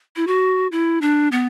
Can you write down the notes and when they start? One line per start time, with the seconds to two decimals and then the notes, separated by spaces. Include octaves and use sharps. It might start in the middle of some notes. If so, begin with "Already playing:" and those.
0.16 E4
0.27 F#4
0.72 E4
1.01 D4
1.32 B3